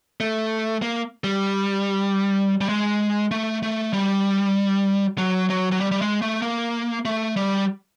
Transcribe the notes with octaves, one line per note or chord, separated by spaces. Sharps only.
A3
A#3
G3
G3
G#3
A3
A3
G3
F#3
F#3
F#3
G3
G3
G#3
A3
A#3
A3
G3